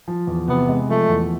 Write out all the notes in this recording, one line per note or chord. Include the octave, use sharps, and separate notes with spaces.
F3
E2
C3 B3
G#3
F3 A3
E2